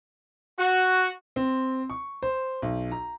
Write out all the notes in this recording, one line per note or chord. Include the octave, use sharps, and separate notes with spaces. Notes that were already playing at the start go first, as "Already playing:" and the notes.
F#4
C4
C#6
C5
B1
A#5